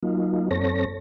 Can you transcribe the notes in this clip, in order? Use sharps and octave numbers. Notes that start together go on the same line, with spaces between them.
F#3 A#3 D#4 F4
F#2 C4 A4 C#5 A#6